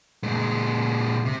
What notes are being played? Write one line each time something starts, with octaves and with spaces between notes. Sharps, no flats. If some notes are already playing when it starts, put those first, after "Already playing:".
A#2 G#3
C3